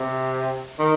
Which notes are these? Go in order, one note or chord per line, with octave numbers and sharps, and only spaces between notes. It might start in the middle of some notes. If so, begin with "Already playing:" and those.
Already playing: C3
D#3